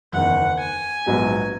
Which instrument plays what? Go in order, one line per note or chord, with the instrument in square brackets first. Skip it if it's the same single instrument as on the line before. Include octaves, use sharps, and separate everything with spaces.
[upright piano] F#1 E2 D#3 [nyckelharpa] F#5
[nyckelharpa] G#5
[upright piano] A#1 G#2 F#3 B3